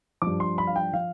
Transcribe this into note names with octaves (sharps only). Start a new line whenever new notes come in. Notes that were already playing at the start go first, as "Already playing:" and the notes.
G2 F3 D6
C6
B5
F5
G5
F3 F5